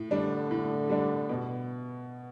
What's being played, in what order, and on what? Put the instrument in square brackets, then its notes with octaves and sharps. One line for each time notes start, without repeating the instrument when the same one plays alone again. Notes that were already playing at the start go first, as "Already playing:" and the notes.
Already playing: [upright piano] A2
[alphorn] D3 [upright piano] G3 D4
[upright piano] A2
G3 D4
B2